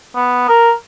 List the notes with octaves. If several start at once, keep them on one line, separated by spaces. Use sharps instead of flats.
B3
A#4